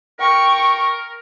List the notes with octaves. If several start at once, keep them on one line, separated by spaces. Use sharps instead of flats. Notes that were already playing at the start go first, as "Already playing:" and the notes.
A#4 G5 C#6